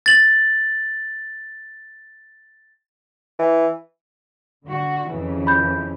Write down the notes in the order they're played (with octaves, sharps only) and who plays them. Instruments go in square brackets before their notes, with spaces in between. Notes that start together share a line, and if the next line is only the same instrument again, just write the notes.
[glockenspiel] A6 F#7
[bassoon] E3
[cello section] D3 F#4
F2 C#3 E3
[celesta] B5 G6